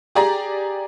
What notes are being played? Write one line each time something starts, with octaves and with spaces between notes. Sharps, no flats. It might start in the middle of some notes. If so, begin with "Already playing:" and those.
G4 G#4 D5 A#5